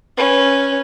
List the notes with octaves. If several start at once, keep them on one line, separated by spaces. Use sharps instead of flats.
C#4 B4